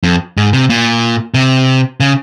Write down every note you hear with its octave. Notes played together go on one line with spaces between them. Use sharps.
F2
G#2
C3
A#2
C3
C#3